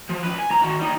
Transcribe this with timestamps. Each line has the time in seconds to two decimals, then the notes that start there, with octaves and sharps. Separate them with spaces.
0.09 F3
0.23 C#2 B4
0.38 G#5
0.50 G#2 A#5
0.62 D#3 F#4
0.79 G3 D#4